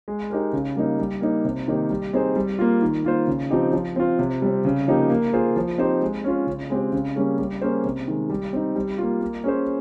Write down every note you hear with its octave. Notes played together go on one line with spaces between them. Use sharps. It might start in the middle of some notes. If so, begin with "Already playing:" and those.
G#3
D#4 G4 A#4
C#3
G3 A#3 D#4
G3
A#3 D#4
C3
D#3 A#3 D#4 G4
G3
C4 D#4 G#4 C5
G3
A#3 F4
D#3
A#3 F4 C5
C#3
F3 C4 D#4 G4
F3
C4 F4
C3
G3 C4
C#3
F3 A#3 D#4 G4
A#3
F4 G#4 C5
F3
C4 D#4 G4 C5
G#3
C#4 F4
C#3
G#3 C4 G4
C#3
G3 A#3 C#4 G#4
G3
A#3 C#4 G#4 C5
C3
D#3 G#3
G3
C4 D#4
G3
A#3 F4
A#3
C#4 G#4 C5